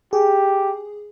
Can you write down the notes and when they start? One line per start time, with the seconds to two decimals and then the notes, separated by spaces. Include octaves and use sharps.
0.13 G4 G#4